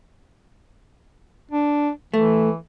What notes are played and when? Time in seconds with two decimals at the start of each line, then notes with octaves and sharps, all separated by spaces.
1.51 D4
2.14 E3 A3